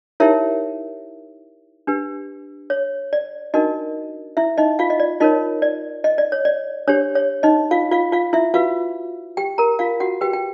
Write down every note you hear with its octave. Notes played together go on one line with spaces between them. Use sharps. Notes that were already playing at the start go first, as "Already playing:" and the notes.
D#4 E4 G4 A#4 C#5 E5
D4 G4 B4
C#5
D5
D4 D#4 F#4 A#4 D#5
E4 E5
D#4 D#5
F4 F5
D#5
D5
D#4 F4 A#4 C#5 D#5
D5
D#5
D5
C#5
D5
D4 G4 C5 C#5
C#5
D#4 D#5
F4 F5
F4 F5
F4 F5
E4 E5
F4 F#4 B4 F5
G4 G5
A#4 A#5
F4 F5
F#4 F#5
F#4 G4 B4 G5
G5